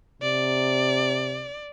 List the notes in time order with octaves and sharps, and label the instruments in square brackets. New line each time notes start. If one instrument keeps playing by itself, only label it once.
[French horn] C3 [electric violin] D5